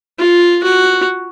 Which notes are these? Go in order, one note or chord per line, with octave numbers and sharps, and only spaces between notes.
F4
F#4